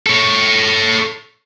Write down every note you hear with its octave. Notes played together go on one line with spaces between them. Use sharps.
A4 C#5